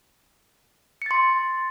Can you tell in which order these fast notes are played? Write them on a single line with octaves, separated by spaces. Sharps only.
C#7 A6 C6